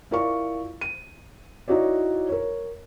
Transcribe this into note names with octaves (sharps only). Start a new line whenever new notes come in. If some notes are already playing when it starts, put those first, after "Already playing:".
E4 F4 A#4 D5 F5 C#6
D#7
D#4 E4 F#4 C#5 D5
A#4 C#5